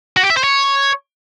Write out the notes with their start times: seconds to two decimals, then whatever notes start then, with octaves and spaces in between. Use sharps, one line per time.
0.17 F#4
0.23 G4
0.30 E5
0.37 C5
0.44 C#5